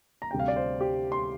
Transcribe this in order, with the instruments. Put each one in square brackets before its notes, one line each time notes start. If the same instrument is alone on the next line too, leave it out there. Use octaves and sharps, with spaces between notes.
[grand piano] A#5
D2 C3 G3 G5
F5
D5
C5
G4
C6